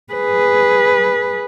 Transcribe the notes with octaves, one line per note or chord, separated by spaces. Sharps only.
G#4 B4